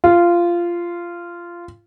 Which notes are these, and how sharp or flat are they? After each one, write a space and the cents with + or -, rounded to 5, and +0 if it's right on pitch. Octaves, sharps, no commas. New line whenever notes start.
F4 -15